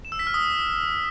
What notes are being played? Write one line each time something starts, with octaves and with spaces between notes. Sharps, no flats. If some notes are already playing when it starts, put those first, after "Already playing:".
E7
E6
B6
F6
D#6